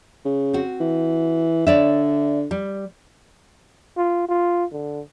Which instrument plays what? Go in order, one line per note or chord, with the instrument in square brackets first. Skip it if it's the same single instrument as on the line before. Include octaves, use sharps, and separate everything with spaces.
[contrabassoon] C#3
[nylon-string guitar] C4 F#4
[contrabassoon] E3
[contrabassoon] D3 [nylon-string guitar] C#5 D5 E5
[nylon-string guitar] G3
[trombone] F4
F4
D3